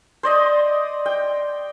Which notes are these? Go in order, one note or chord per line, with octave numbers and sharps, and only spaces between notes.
C5 D5 D#5
G5